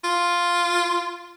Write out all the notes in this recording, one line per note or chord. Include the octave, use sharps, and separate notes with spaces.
F4